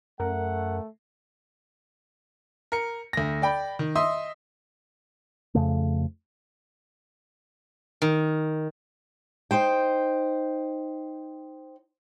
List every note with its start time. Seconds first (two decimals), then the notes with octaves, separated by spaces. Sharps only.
0.20 F#2 A3 A#4 F#5
2.72 A#4 C#7
3.13 D2 A#6
3.42 D5 G5 B5
3.79 D#3
3.95 D#5 E5 C6 D#6
5.55 F2 C#3 A3
8.02 D#3
9.51 D#4 C5 G5